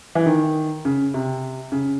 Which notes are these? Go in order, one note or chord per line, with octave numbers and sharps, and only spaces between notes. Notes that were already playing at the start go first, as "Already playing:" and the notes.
E3
D#3
C#3
C3
C#3